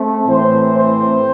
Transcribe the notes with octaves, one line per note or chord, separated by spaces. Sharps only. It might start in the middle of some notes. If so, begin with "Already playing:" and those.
Already playing: A3 C4
A2 E3 C4 C5
C5